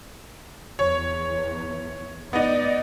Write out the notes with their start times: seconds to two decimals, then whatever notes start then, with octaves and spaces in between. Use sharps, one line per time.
0.79 E2 C#5
2.33 B3 D#4 D5 D#5